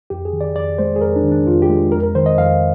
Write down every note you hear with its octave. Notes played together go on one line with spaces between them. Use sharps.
F2 G4
G#4
D#3
D5
F2 D5
G#3 C5
G#4
F2 A#4
D4
D#3
D4
F2 F4
G4
G#3
F2 A#4
A#4
D#3 C5
D#5
F2 F5